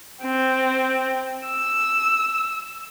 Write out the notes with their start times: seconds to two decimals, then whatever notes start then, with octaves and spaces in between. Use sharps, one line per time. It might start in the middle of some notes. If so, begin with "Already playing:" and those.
0.22 C4
1.46 E6